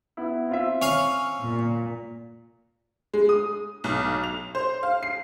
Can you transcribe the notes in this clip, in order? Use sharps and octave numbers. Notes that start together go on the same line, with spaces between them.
B3 E4
C4 F4 E5
C#4 F5
A#2
G#3
D#6
B1
F7
C5
F5
C7